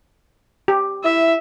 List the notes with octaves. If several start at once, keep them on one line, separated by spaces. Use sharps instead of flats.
G4
E4 E5